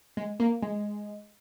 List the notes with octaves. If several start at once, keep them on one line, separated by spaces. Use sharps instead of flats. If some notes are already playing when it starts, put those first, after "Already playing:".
G#3
A#3
G#3